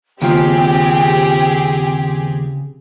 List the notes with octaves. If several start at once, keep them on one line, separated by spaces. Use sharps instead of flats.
D#2 C#3 F3 C4 G4 G#4 G5